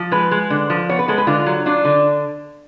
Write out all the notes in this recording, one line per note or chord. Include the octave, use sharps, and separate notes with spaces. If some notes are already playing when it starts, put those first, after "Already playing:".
Already playing: F3
G#3 B4
G#3
D3
F3
B3 C#5
B4
G#3 A4
B4
D3 F4
F#3
D4 F4
D3